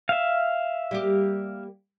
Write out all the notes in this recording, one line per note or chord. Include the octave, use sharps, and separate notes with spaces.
E5 F5
G3 A#3 G4